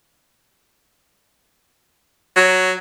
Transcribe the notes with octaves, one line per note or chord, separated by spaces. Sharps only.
F#3